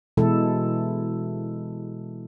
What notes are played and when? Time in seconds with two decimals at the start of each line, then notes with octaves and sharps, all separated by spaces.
0.17 B2 E3 G#3 E4 A4